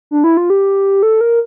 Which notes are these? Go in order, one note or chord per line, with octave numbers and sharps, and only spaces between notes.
D4
E4
F4
G4
A4
A#4